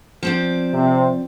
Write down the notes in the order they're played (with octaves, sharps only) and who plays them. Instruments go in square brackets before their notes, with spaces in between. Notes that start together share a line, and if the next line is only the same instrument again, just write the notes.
[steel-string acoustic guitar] F3 C4 D5
[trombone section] C3 C5